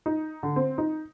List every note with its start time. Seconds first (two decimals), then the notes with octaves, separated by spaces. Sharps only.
0.06 D#4
0.43 D3
0.56 C4
0.78 D#4